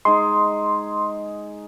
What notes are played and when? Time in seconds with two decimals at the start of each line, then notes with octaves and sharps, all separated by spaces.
0.05 G#3 D#4 C6